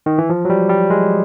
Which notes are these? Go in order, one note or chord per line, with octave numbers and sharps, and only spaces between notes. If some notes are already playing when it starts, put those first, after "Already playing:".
D#3
E3
F3
F#3
G3
G3
G#3